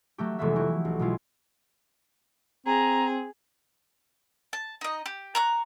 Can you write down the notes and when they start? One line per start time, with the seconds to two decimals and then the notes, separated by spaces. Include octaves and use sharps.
0.18 F#3 A3 G4
0.39 F1 E3 G#3 A3 B3 E5
0.56 F#3 A3 E4 G4
0.85 B1
0.99 B2 G#3 E4 F4
2.66 C4 G#4 A#5
4.53 A5
4.81 D#4 D#5
5.06 G4
5.35 A#5 C#6 F#6